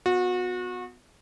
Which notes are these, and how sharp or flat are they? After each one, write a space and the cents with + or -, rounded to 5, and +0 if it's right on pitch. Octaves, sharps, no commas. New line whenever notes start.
B3 +20 F#4 -30